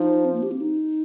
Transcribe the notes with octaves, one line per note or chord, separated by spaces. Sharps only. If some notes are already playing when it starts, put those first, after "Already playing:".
Already playing: F3 D#4
C4
A#3
G4
C4
D#4